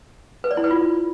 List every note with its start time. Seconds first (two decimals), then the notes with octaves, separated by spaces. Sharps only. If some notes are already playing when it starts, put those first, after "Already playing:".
0.44 B4
0.51 D5
0.57 E4
0.64 B4
0.71 F4